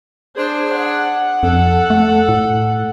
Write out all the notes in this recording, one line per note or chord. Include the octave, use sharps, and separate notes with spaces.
D4 G#4 C5
F#5
F2 A4
A3
A2